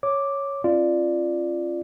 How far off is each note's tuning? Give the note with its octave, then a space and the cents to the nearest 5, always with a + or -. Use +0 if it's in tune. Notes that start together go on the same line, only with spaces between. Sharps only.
C#5 +0 D6 +0
C#4 -45 F4 -20 D5 +10